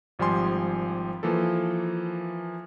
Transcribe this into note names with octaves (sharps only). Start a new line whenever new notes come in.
G#1 F3 G3 G#5 C6
E3 F3 A#3 A4